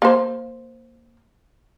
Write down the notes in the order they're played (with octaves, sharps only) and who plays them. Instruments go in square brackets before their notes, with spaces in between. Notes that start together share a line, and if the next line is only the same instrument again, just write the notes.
[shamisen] A#3 C5